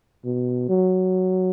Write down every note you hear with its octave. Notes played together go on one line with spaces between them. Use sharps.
B2
F#3